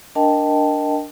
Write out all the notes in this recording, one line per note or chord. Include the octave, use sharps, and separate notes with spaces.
D4 A#4 D#5 G5 A5